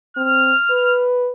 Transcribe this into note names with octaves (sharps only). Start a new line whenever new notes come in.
C4 F6
B4